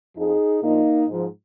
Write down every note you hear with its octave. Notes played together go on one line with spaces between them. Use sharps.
F2 F3 D#4 G#4
A#2 F3 A#3 D#4
G#2 F3